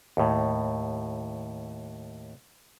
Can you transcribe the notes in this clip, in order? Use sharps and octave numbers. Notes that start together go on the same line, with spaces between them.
D#2 A2